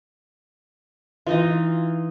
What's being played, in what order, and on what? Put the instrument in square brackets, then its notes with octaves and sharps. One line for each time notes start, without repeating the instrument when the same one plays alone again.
[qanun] E3 D#4 D#5 [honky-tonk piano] F4